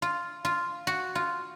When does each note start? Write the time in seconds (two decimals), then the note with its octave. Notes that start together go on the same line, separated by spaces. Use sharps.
0.02 F4
0.45 F4
0.87 F#4
1.15 F4